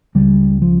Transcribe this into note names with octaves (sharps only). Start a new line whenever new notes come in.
C#2 C#3 G3
F3